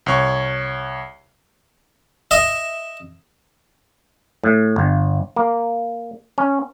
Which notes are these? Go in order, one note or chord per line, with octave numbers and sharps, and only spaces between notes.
C2 C#5 C#6
D#5 E5
A2
G1
A#3
C#4